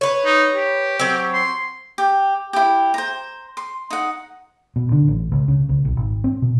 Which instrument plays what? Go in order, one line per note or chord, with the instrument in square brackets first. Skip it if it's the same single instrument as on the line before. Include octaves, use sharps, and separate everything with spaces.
[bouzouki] B4 C#5
[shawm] D#4
G4
[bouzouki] F#3 C4
[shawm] C6
[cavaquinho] G4
E4 G4
C5 A#5
C6
D#4 F#5
[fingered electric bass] B2
D3
A1
C#2
C#3
C#2
B1
G#1
C4
B2